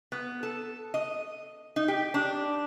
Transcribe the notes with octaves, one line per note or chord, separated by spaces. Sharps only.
B3
A4
D#5
D#4
G4
D4